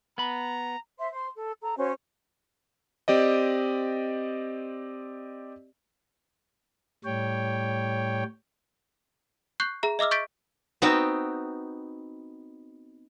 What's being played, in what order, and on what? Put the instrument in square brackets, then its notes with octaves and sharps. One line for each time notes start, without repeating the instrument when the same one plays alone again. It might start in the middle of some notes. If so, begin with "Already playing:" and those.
[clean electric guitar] B3 B5 [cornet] A#5
[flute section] C5 E5 C6
C5 C6
A4
A4 A#5
C#4 F#4 C5 C#5
[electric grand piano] C4 G4 D5 D#5
[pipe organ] A2 G3 C#5 G5
[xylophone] C#6 F#6 G6 C7
G#4 E5 A#5
D#5 E5 D6 E6 F6
C#6 G6 A6 B6 D7
[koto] B3 C4 D#4 F#4 G5